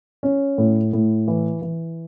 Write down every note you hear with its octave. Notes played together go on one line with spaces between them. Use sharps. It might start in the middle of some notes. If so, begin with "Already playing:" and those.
C#4
A2
A2
E3
E3